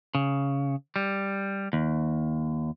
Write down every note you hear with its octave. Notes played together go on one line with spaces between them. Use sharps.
C#3
G3
D#2